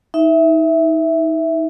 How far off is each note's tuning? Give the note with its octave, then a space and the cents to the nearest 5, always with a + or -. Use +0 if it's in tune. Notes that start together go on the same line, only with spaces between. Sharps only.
D#4 +30 E5 +0